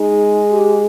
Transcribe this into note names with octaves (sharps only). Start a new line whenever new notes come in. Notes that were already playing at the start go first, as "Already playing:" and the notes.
Already playing: G#3 D#4
G4